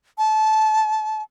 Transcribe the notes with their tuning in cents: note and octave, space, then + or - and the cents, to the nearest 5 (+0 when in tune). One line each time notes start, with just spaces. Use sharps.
A5 -20